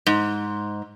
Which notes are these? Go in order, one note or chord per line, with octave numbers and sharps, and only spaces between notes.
G#2